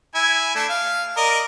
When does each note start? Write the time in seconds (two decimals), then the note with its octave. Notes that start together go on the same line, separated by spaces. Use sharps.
0.15 E4 G#5
0.56 A3 D4
0.69 F5
1.17 A#4 D5 D#5